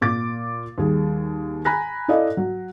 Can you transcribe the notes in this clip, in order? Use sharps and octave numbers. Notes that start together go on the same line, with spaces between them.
A#2 D6 A6
D#2 G3 G#4
G#5 A#5 B5 F#6 A#6
E4 A4 D5 D#5 F5
F#3